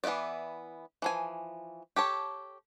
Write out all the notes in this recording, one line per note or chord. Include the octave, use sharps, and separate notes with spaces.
E3 B3 E4 B4 D5
E3 F3 G#5
G4 A4 C#5